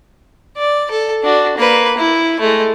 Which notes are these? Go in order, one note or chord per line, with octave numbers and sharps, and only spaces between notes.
D5
A4
D4 F#4
A#3 B4
E4
G#3 A3